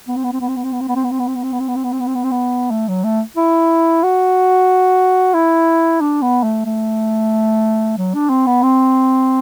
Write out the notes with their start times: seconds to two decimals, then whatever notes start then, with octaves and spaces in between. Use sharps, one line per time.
0.08 B3
0.16 C4
0.24 B3
0.32 C4
0.41 B3
0.48 C4
0.56 B3
0.64 C4
0.73 B3
0.81 C4
0.88 B3
0.95 C4
1.04 B3
1.11 C4
1.19 B3
1.27 C4
1.35 B3
1.43 C4
1.52 B3
1.60 C4
1.68 B3
1.76 C4
1.84 B3
1.92 C4
2.00 B3
2.07 C4
2.15 B3
2.24 C4
2.32 B3
2.71 A3
2.88 F#3
3.04 A3
3.37 E4
4.03 F#4
5.34 E4
6.01 D4
6.22 B3
6.43 A3
6.65 A3
7.98 F#3
8.14 D4
8.29 C4
8.47 B3
8.62 C4